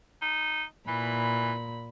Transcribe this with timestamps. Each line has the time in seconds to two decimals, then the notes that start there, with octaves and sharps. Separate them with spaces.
0.22 D#4
0.88 A#2 E3 B5